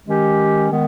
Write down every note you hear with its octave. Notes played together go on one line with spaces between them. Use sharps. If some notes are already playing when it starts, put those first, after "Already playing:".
D#3 G#3 C#4 G4
D#3 G#3 B3